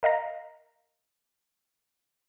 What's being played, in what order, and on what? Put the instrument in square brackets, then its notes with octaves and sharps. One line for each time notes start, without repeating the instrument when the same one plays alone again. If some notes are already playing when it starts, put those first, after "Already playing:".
[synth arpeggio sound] A#4 D#5 F5 A#5